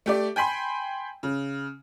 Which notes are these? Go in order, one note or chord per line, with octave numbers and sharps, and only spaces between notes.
A3 G4 D5
G5 G#5 B5 C6
C#3